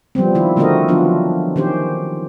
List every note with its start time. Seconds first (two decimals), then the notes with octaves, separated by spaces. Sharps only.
0.15 F3 G3 B3 C4
0.35 D#3 E4 F4
0.56 D3 A3 C4 F#4 A#4 D#5
0.88 F3 F#3 B3 D4 F4
1.56 D#3 C#4 G4 C5